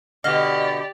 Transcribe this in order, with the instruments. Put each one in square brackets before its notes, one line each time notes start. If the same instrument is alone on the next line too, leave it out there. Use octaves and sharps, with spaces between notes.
[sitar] B2 D3 [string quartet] G4 D5 [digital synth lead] D#5 [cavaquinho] F5